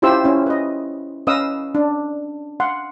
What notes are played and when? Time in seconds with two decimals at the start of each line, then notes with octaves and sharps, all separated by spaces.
0.02 C#4 E4 F4 G4 C5 E6
0.24 C#4 E4
0.46 B4 D#5
1.27 C#4 B4 D#5 F5 D#6 E6
1.75 D4
2.60 F5 F#5 C6